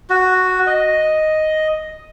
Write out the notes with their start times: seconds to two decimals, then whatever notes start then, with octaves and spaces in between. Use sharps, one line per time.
0.10 F#4
0.67 D#5